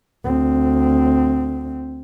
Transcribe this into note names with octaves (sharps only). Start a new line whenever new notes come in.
D2 C4